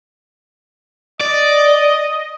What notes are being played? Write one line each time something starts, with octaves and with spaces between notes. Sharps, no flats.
D5 D#5